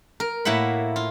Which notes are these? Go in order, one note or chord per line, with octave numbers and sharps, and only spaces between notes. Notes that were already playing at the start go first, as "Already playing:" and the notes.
A#4
A2 A#3 E4 F#5 B5
F4